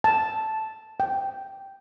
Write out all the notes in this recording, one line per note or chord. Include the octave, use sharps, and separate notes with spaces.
A5
G5